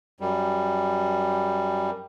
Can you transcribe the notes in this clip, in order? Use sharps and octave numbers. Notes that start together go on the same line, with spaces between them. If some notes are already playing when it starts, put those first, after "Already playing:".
F#2 G3